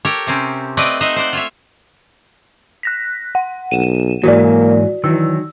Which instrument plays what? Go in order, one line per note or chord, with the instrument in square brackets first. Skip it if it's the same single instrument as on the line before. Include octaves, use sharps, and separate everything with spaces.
[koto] G4 A4 A#4 C#5
C3 C4 C#4
A3 C4 B4 D5 D#5
D#4 C5 D#5 E5 F#5
C5 D5 F#5
F4 C#5 E5
[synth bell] F#6 A#6 B6
F#5
[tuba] B1 [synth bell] D#7 E7
[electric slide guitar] G#2 E3 F#3 [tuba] A#3 [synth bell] F#4 D5
[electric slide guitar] D#3 F#3 [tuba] E3 [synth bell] E6